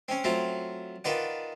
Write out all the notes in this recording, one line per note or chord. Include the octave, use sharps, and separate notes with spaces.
C4 C#4
F#3 A3 C4 F4
D#3 F4 B4 D5 F#5